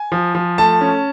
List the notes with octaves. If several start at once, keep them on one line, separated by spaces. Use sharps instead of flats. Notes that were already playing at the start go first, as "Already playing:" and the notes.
Already playing: G#5
F3
F3
A3 A5
C#4